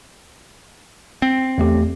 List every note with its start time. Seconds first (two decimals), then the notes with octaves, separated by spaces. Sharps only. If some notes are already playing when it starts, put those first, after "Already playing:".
1.22 C4
1.58 E2 A3 G4